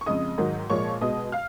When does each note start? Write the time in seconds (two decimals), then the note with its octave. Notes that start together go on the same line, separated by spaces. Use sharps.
0.01 C#6
0.06 F2 C#3 G#3 D#5 D#6
0.38 G#2 D#3 F#3
0.70 A#2 F3 G#3 C#5 C#6
1.01 B2 G#3 D#5 D#6
1.32 F5 F6